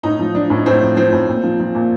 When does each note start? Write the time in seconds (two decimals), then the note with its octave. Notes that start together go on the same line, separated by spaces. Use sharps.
0.03 A2 D#4
0.19 F3
0.35 F3 D4
0.50 A2
0.66 A2 C4
0.81 F3
0.97 F3 C4
1.13 A2
1.28 A#2
1.43 F3
1.60 F3
1.75 A#2